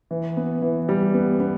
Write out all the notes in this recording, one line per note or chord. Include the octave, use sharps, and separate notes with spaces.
E3
B3
E3
G3
B3
B3